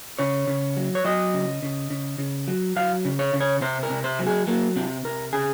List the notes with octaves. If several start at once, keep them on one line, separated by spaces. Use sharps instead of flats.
C#3 C#5
C#3
F#3
C#5
F#3 D#5
C#3
C#3
C#3
C#3
F#3
F#3 F5
C#3
C#5
C#3
C#5
C3 C5
A#4
C3
C5
F#3
G#4
F#3 A#3
C3 C4
C3 A#4
C#3 G#4